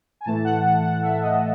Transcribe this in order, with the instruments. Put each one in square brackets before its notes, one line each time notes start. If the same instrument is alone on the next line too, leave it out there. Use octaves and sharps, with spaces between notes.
[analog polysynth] G#5
A2 E3 A3 A5
F#5
F#5
F#5
E5
D#5